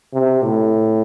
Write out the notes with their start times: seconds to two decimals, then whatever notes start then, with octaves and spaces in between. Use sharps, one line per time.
0.14 C3
0.43 A2